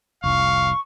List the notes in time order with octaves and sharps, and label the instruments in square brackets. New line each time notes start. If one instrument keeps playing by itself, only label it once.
[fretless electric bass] F1 C2 [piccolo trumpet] F5 [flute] C#6